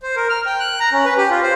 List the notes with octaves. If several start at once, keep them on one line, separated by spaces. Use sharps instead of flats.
C5
A#4
F6
G5
F#6
A#5
C#4
B4
G4
F4
C5